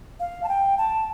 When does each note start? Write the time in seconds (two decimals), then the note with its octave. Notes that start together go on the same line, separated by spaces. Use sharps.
0.20 F5
0.43 A5
0.48 G5
0.78 A5